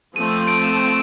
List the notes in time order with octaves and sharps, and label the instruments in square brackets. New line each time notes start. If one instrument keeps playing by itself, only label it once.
[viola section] F3 A3 C4 [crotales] D#7
[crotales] D#7
D7
E7